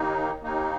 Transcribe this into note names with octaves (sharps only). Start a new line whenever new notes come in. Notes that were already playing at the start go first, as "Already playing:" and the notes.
Already playing: D#2 D#3 A#3 D#4
D#2 D#3 A#3 D#4